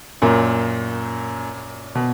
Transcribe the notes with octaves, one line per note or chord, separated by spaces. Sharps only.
F#2 A#2
B2